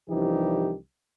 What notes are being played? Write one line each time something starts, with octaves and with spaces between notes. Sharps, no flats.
C2 E3 F3 D4 D#4 G4